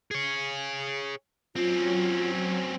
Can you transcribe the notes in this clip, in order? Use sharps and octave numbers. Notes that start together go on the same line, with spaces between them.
G#4 C#5
F#3 C4 C#4 F4